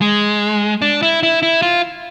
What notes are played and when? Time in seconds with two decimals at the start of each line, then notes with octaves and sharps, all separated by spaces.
0.01 G#3
0.82 D4
1.03 E4
1.23 E4
1.43 E4
1.62 F4